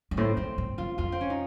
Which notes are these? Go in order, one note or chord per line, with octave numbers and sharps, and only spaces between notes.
F#2
A2 C4
F#2 C4
A2
F#2 F4
F2 F4
C4
C#4
D#4